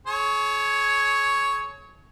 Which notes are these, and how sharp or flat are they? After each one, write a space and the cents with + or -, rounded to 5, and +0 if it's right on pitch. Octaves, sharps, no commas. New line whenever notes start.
G#4 +45 C#5 +5